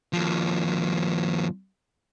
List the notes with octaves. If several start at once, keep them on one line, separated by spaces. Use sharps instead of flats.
D#2 F3